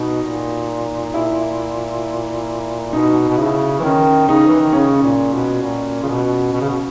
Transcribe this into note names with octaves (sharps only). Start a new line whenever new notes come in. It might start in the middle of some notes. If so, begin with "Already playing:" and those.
Already playing: B2 D#4
A#2
E4
B2 D#4
B2
C#3 E4
E3
D#3 C#4
C#3 D#4
E3
D#3
C#3 C#4
A#2
B2
A#2
C#3
B2
B2
C#3
B2